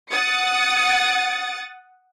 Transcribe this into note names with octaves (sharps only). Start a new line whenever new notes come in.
F#5 D#6 A6 C#7